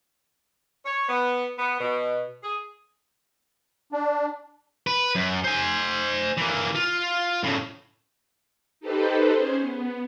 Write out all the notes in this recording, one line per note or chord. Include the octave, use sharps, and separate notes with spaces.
C#5
B3
B3
B2
G#4
D4
B4
F#2
C5 G#5
E3 A#3
F4
A2 C#3
D#4 G4 A4 B4 C5
C#4 G#4 C5
B3